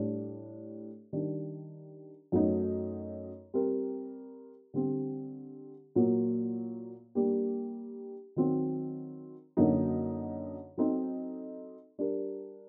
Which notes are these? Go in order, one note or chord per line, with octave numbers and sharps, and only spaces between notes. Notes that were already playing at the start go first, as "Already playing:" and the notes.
Already playing: A2 G3 D4
D#3 G3 D4
F#2 F#3 A3 D#4
G3 C4 G4 A#4
D3 G3 C4 G4
A#2 F#3 A#3
G3 A#3 D4 G4
D#3 F#3 C4
F#2 D3 F#3 A#3 D#4
F#3 C4 D#4 A4
G3 D4 G4 A#4